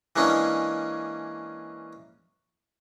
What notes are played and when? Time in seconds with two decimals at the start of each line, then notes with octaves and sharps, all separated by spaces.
0.16 E3 G#3 A#3 C#4 D4